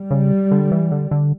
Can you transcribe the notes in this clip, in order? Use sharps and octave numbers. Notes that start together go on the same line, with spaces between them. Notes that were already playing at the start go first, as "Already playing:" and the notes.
Already playing: G3
C#3
D3
E3
D3
D3